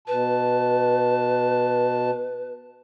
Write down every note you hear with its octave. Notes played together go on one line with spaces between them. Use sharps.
B2 B4 A5